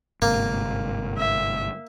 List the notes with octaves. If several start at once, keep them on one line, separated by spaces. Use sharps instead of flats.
G1 G#2 C3 A#3
E5